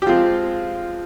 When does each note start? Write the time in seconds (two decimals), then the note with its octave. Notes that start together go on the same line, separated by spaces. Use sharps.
0.02 G4
0.06 F3 G#3 C4 F4